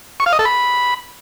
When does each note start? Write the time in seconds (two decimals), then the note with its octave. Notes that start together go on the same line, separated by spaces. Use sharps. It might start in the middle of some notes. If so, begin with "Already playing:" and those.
0.20 C#6
0.26 F5
0.33 D#5
0.39 A4
0.45 B5